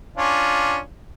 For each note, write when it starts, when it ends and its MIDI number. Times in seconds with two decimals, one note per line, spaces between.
0.17 0.78 61
0.17 0.78 62
0.17 0.78 65